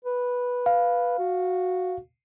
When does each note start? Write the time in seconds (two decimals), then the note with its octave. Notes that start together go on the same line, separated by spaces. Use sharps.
0.05 B4
0.66 F5
1.19 F#4